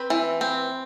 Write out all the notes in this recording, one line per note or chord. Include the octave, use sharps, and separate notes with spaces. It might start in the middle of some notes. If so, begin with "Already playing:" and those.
Already playing: C4 B4
E3
C4